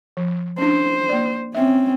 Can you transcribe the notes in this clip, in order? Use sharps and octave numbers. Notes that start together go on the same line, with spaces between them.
F3
C#4 D4 C5
A#3 D5
C4 C#4 E5